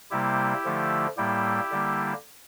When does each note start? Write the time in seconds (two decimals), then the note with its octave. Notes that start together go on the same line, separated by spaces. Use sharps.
0.11 C3 G3 A#3 E4 G4
0.65 D3 F3 A3
1.17 A2 G3 A#3 E4 G4
1.71 D3 G3 A#3